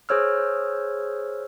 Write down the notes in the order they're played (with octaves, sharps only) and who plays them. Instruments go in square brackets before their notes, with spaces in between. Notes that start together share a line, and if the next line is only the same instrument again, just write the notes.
[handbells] G#4 C5 C#5 E6 F6